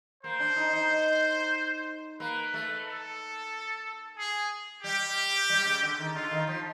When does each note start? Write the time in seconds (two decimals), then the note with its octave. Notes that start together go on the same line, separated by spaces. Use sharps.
0.24 A#3 C5
0.40 D4
0.56 D#4
0.73 D#4
2.20 A#3 B4
2.54 A3
2.86 A4
4.18 G#4
4.84 G3 G4
5.49 G3
5.65 C#3
5.83 D3
5.98 D#3
6.15 D3 F4
6.31 D#3
6.47 F3